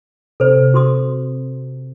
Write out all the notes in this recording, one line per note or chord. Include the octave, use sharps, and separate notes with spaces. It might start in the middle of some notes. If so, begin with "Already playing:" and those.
C3 A4 C5
F#4 C6 D#6